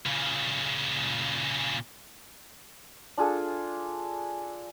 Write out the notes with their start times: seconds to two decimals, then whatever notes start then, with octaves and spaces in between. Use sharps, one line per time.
0.06 A#2 C#3
3.18 D4 F4 G#4 A4